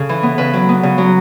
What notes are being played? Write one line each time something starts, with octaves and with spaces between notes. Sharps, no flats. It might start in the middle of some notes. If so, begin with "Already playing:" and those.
Already playing: C#3 A4
E3
B3
C#3 B4
F#3
B3
C#3
F#3